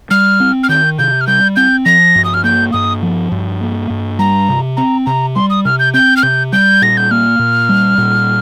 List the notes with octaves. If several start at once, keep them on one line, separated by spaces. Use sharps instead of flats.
G3 F6
C4
F6
D#3 G6
C3 G6
F6
G3 G6
C4 G6
F3 A#6
G2
D#6
F6
A#3 G6
G2 D#6
F3
G2
A#3
G2
G3 A#5
C3
C4 A#5
C3 A#5
G3 C6
D#6
C3 F6
G6
C4 G6
F6
C3 G6
G3 G6
A#2 A#6
G6
A#3 F6
A#2
G3
A#2